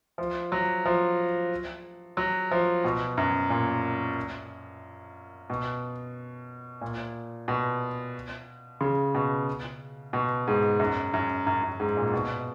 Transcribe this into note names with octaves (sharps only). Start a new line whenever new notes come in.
F3
F#3
F3
F#3
F3
B2
F#2
A#2
B2
A#2
B2
C#3
B2
B2
G#2
F#2
F#2
F#2
F#2
G#2
A#2
B2